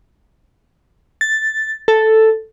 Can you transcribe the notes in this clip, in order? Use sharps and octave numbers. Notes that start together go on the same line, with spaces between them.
A6
A4